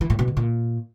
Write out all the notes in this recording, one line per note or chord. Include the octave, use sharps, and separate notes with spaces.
E3
A2
B2
D3
A#2